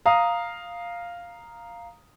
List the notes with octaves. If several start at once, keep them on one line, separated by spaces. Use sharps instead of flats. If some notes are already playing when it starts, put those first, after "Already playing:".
F5 A#5 D#6